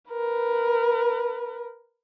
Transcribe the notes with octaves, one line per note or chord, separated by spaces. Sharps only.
A#4 B4